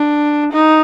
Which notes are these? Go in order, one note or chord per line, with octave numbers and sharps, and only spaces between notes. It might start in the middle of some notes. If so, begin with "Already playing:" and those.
Already playing: D4
D#4